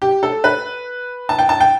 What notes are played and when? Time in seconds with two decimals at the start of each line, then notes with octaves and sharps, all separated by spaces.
0.02 G4
0.23 A4
0.44 B4
1.29 A5
1.39 G5
1.49 A5
1.60 G5